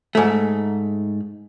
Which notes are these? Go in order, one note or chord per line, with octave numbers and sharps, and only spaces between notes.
G#2 A3